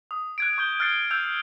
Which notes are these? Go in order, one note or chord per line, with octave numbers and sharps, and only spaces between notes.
D#6
F#6 G#6 D7
C#6 G6 G7
F6 F#6 A6 C7 C#7
E6 G6 F7